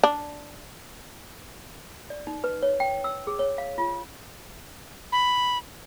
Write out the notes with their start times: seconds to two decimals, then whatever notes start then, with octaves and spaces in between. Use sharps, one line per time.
0.04 D4
2.10 D5
2.27 D#4
2.44 B4
2.62 C#5
2.80 G5
3.04 E6
3.27 G#4
3.39 C#5
3.58 F5
3.78 F4
5.12 B5